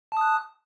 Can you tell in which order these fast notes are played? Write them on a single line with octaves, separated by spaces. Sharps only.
A5 D#6 F#6